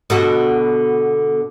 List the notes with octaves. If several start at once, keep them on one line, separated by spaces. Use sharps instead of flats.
B2 D3 F#4